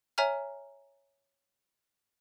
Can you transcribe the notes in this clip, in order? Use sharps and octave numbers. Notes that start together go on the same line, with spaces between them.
C#5 E5 G#5 A#5 F6